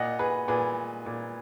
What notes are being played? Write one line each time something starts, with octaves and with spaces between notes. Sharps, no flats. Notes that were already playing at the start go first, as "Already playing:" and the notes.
Already playing: A#2 D#5 F#5
G#4 B4
A#2 G#4 B4
A#2